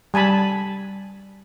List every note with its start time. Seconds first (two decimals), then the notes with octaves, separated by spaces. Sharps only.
0.14 G3 G#5 A5 B5